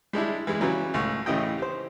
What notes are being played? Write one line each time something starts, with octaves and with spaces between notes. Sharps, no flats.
G3 G#3 D4 E4
E3 G3 G#3
C#3 E3 F#3 G3
C#2 A2 C#6
A1 A2 C#3 E4 D#5 G5
G4 C5